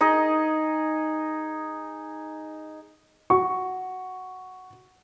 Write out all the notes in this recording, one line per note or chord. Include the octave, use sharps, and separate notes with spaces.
D#4 G#4 D#5
F#4 C#6